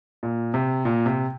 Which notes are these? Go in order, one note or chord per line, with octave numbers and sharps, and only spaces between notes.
A#2
C3
A#2
C3